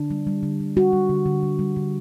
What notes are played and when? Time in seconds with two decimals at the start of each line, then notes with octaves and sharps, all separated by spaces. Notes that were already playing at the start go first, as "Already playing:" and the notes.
Already playing: D3 D4
0.10 G3
0.27 G3
0.43 D3
0.60 D3
0.77 G3 F#4
0.93 G3
1.10 D3
1.26 D3
1.43 G3
1.59 G3
1.76 D3